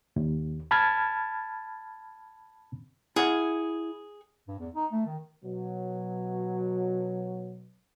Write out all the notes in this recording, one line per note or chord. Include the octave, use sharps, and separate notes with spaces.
D#2
A5 B5 F6 G#6 A6
E4 G#4 F#5
G2
E2
D#4
A3
D#3
B2 F#3